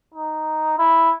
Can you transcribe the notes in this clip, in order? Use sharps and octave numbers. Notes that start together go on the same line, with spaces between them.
D#4
E4